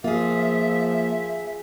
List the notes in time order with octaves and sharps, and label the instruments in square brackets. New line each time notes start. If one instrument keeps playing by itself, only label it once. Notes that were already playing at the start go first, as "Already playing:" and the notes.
[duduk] F3 [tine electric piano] A#3 [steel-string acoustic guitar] F4 G#4 [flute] E5